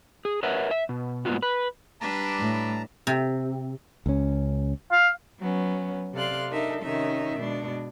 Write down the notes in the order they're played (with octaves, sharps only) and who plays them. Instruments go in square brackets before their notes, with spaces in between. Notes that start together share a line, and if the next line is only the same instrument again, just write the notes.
[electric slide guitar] G#4
A#4 B4 C#5 E5 F#5
E5
B2
G#2 A#3 B3 F4 F#4
B4
[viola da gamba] G3 D4 B4 [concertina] A5 A#5
[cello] A2
[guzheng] C3
[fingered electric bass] C#2 C#4
[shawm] F5
[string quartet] F#3 B3 C#4
C3 A4 D5 F5 C6 F#6
D4 D#4 A4 A#4 E5
C3 D#3 C#4 D#4 E5
B2 G#3 D4